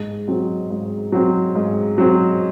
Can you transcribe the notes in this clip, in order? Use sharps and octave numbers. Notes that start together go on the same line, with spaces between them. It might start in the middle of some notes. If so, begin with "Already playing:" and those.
Already playing: G#2
F#3 C4
G#2
F#3 C4
G#2
F#3 C4